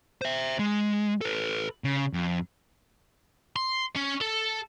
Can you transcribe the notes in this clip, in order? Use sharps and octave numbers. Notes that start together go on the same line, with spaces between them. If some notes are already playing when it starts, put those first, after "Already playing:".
C5 E5
G#3
A4 B4
C#3
F2
C6
C#4
A4